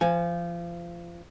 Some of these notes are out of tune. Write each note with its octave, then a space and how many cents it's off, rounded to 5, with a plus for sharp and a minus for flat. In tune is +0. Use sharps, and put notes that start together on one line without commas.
F3 -25 G#5 +0